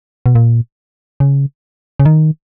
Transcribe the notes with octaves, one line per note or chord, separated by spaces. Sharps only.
B2
A#2
C#3
C#3
D#3